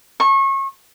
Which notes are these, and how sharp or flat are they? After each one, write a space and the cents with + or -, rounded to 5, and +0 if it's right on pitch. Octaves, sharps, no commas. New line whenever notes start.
C#6 -30